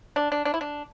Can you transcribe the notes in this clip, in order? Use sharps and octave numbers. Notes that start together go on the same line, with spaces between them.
D4
D4
D4
E4
D4